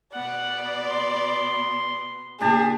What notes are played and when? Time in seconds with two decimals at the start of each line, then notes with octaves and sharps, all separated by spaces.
0.14 B2 B3 D5 F#5
0.88 C6
2.41 A#2 C#3 D4 G4 G#4 A5